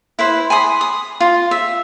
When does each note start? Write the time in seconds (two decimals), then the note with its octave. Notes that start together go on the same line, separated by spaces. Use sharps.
0.19 E4 B4 C5
0.50 G#5 B5 C6 D#6
0.81 D#6
1.20 F4
1.51 E5